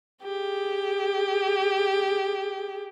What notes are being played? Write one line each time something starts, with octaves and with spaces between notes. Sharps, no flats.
G4 G#4